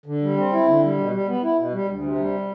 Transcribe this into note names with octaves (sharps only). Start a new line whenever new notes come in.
D3
G3
C4
E4
D3
G3
B2
G3
B3
E4
B2
G3
D2
C3
G3